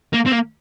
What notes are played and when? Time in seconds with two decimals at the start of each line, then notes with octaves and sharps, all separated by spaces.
0.14 A#3
0.27 C4
0.33 A#3